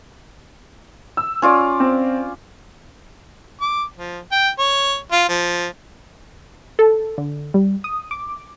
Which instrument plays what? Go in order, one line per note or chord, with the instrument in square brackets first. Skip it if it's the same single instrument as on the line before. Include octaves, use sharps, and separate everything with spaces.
[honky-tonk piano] E6
[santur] C#4 F4 D5
[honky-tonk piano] C4
[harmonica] D6
F3
G5
C#5
F4
F3
[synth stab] A4
D3
G3
D#6
D6